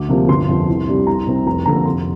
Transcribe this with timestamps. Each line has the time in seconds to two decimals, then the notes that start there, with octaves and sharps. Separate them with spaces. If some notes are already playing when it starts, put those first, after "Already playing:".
Already playing: D2 D6
0.09 C3 F3 A#3
0.28 G1 C6
0.48 F2 F3 C4
0.68 C2
0.87 C3 G3 D4
1.07 C2 A#5
1.27 C3 G3 C4
1.46 F1 A#5
1.66 F2 D3 A#3 A#5
1.85 F1 C6